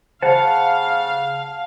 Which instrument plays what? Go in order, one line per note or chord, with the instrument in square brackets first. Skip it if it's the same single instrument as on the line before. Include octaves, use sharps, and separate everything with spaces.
[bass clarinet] C#3 [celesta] C5 [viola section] F5 [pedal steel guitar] F#5 A5